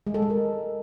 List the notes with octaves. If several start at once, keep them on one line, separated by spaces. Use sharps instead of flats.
G#3
A4
G#3
A#4